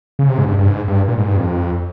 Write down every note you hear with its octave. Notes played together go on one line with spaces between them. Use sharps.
C#3
C3
G#2
G2
G2
G#2
G2
A#2
G#2
G2
F2